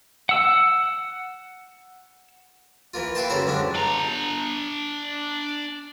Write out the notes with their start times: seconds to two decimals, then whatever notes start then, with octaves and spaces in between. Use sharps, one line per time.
0.29 F#5 E6
2.94 E3 A#3 F4
3.15 E4 B4 F5 G5 A5 C6
3.30 F#2 C#3 E3 A4 C5 A#5
3.46 G2 D3 G#3 D4
3.75 D4 A#5